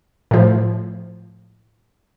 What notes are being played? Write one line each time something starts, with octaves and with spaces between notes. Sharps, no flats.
A2 F3